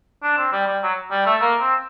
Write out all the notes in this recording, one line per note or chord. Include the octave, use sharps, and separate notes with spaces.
D4
C4
G3
G3
F#3
G3
A3
A#3
C4